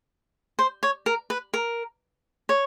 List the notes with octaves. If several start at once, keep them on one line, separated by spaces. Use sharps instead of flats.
C5
C#5
A#4
B4
A#4
C#5